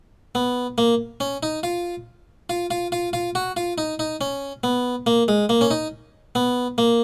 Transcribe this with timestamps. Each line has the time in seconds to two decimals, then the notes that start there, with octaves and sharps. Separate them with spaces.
0.35 B3
0.78 A#3
1.20 C#4
1.43 D#4
1.63 F4
2.50 F4
2.71 F4
2.92 F4
3.13 F4
3.35 F#4
3.57 F4
3.78 D#4
3.99 D#4
4.21 C#4
4.64 B3
5.07 A#3
5.28 G#3
5.49 A#3
5.61 C#4
5.71 D#4
6.35 B3
6.78 A#3